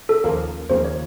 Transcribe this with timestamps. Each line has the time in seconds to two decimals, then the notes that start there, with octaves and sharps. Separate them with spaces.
0.09 A4
0.24 D#2 C#3 F3 A#3 A#4
0.69 D#2 C#3 F3 A#3 C5
0.85 C#5